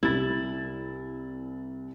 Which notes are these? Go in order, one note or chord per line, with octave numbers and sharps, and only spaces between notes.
C2 E4 A6